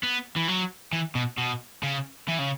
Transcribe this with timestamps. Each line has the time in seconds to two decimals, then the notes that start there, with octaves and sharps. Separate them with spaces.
0.03 B3
0.36 E3
0.48 F#3
0.93 E3
1.15 B2
1.38 B2
1.83 C#3
2.28 E3
2.39 C#3